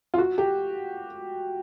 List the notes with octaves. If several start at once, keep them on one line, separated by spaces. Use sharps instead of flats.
F4
F#4
G4